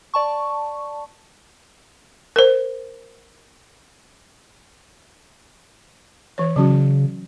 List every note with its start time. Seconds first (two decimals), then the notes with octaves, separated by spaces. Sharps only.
0.14 D5 A5 C#6
2.36 A#4 C5
6.38 E3 C#5
6.56 C#3 F#3 C#4 F#4